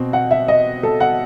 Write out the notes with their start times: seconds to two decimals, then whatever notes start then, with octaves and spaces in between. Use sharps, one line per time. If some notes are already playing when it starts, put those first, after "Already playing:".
Already playing: B2 C4
0.13 F#5
0.31 E5
0.48 D#5
0.83 A4
1.00 F#5